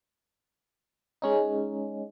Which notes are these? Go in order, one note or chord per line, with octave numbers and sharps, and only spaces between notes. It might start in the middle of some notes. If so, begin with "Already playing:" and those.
G#3 C#4 D#4